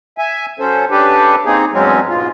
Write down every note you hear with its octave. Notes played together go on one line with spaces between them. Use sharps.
E5 G#5
F#3 C#4 A4 C5
C#3 D4 G4 A4 B4
A#3 C4 D#4 G#4
E2 G2 F#3 G#3 C4 C#4
G#2 B2 F4